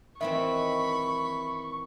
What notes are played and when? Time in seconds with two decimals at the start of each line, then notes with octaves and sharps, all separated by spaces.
0.21 D#3 E3 C4 E5 B5 C#6